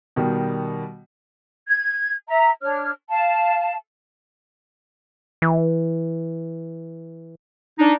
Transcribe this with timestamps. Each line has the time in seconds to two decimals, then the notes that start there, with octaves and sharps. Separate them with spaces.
0.16 B2 D#3 G3
1.67 G#6
2.28 E5 A#5
2.62 D4 C#5 F6
3.09 F5 A5
5.42 E3
7.79 D4 D#4